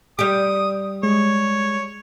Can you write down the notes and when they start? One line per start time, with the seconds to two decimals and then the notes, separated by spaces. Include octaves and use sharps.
0.19 G3 G4 D#6
1.03 G#3 C#5